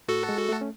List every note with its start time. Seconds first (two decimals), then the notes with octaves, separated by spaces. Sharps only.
0.08 A2 F#4 A4
0.29 G#3
0.49 A3
0.61 C#4